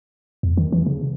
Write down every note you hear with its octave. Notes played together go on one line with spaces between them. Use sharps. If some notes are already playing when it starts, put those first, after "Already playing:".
E2
D#3
E3
C#3